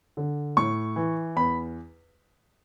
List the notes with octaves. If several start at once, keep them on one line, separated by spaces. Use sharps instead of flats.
D3
A2 C#6
E3
E2 B5